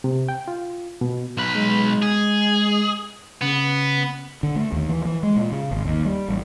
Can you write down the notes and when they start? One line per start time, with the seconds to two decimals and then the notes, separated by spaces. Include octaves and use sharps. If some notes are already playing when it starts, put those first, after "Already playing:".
0.04 C3
0.29 G5
0.48 F4
1.01 B2
1.37 B1 B4
1.55 G#3
2.02 G#4
3.41 C#3 B3
4.43 D3
4.55 A3
4.72 D#2
4.89 E3
5.05 E3
5.23 G#3
5.36 A#2
5.52 C#3
5.71 G#1
5.86 D#2
6.05 G3
6.28 A1